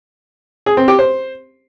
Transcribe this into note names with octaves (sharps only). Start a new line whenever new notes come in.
G#4
C4
G4
C5